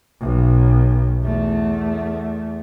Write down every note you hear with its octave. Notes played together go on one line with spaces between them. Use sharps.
B1
E2 A3